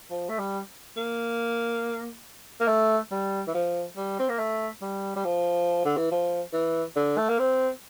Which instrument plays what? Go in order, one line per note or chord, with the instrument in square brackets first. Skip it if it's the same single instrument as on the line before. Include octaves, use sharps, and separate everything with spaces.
[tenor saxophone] F3
A3
G3
A#3
A#3
A3
G3
E3
F3
G3
C4
A#3
A3
G3
G3
F3
D3
E3
F3
E3
D3
A3
A#3
C4